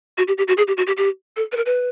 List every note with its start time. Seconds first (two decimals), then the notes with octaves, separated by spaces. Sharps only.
0.18 F#4
0.28 G4
0.38 G4
0.48 F#4
0.57 G#4
0.68 G4
0.77 F#4
0.87 G4
0.97 G4
1.37 A4
1.52 B4
1.57 A#4
1.66 B4